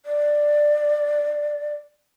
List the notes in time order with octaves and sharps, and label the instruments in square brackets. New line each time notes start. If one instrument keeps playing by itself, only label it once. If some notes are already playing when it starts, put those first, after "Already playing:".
[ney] D5